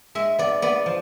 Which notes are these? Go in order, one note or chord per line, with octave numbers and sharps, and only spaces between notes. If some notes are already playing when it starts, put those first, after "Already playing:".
G#3 E5
B3 D5
B3 D5
F3